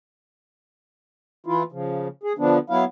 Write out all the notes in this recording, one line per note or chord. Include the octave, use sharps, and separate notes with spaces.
E3 E4 F4
C#3 F3
G#4
D3 F3 B3 D4
F#3 B3 E4 F5